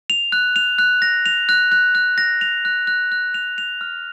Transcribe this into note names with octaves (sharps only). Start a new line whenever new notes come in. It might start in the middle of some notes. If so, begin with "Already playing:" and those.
F7
F#6
F7
F#6
A#6
F7
F#6
F#6
F#6
A#6
F7
F#6
F#6
F#6
F7
F7
F6